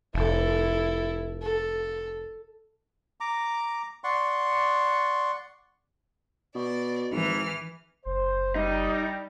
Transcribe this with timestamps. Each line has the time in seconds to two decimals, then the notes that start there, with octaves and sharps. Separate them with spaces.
0.14 F1 E4 A4
1.42 A4
3.20 A#5 D6
4.04 D5 F#5 C6 C#6
6.55 B2 D5
7.12 G#1 E3 F6
8.06 F#1 C5
8.56 G3 D#4